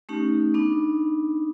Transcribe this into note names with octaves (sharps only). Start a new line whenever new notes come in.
A3 C#4 D#4 G4
B3 D4 D#4